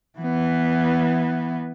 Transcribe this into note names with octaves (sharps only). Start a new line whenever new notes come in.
E3 B3